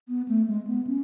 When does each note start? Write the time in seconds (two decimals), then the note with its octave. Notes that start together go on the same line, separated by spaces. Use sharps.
0.09 B3
0.28 A3
0.47 G#3
0.67 B3
0.87 C#4